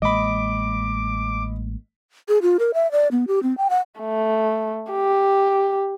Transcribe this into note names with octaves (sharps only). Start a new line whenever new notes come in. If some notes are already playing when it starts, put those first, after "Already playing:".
A1 G#3 A#3 D#5 B5 D6
G#4
F4
A#4
E5
D5
B3
G4
C4
G5
F#5
A3
G4